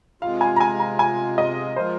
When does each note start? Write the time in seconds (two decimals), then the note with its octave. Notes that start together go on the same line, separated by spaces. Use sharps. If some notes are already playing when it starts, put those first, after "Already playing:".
0.22 C3 G#3 F4 F5
0.41 G#5
0.56 A#5
0.61 G#5
0.80 A#5
0.99 G#5
1.38 D#5
1.76 F3 G#3 F4 A#4 C5